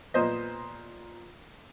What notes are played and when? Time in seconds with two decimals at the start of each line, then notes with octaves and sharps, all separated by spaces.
0.14 A#2 B3 C5 D#5